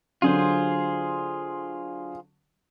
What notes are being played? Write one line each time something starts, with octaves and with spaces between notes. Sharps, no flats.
D3 F#3 F4 G#4 C5